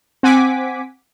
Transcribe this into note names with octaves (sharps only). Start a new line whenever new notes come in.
C4 F#5 G#5 D6 B6